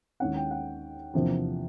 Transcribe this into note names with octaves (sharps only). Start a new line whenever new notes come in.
D#2 D#3 G#3 C#4 E4 F#5
G5
F#5
E2 C3 F3 A#3 D4